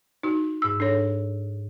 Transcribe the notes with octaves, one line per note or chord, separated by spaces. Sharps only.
D#4 F#4
G#2 E6
D4 A4 C#5